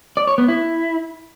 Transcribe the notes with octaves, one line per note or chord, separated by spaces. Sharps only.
D5
C#5
B3
E4